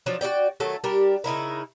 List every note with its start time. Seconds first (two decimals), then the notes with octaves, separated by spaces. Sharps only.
0.06 F3 F#3 D4
0.21 F#4 A#4 D5 G5
0.60 D#3 F#3 A3 A4
0.84 G3 D4 G4 A#4
1.24 C#3 D#4 E4 A#4